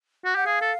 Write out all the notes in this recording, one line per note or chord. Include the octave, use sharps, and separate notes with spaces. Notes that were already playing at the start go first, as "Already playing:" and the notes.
F#4
G4 F#5
G#4 F5
A4